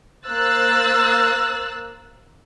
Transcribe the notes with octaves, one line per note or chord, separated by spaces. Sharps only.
A#3 C5 E6 F#6 A6